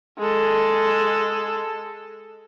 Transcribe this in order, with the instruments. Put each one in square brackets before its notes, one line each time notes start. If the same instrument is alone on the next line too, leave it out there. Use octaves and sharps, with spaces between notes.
[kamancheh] G#3 A4